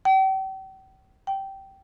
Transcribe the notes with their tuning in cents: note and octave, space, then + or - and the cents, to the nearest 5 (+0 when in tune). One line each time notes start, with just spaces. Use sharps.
G5 -40
G5 -15